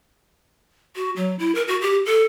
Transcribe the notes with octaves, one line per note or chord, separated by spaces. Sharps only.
F#4
F#3
E4
A#4
F#4
G4
A4